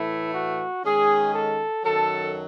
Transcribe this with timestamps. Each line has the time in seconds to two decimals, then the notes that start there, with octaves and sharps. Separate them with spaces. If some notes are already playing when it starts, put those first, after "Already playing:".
Already playing: A2 E3 A3 E4
0.35 F#4
0.85 D#3 G#3 C#4 G#4
1.34 A4
1.84 F#2 D#3 F#3 A4